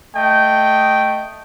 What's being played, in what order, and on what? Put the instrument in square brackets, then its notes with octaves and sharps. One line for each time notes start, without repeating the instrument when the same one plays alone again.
[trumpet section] A3 D#5 G5